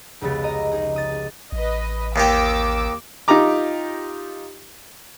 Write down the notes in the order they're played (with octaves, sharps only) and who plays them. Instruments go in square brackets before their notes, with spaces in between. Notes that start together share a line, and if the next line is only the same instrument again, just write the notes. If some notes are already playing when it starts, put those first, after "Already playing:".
[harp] F1 C#2 C#3 B3 A6
D#5 A#5
D#4 G#4
D#6 A6
[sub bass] A1 [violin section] B4 D#5
[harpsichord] D#2 D#3 G4 [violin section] D6 E6
[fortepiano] D#4 F4 G4 A#5 D6